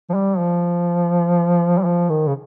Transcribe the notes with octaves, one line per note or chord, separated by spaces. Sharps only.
F3
G3
F3
G3
F3
D#3
C#3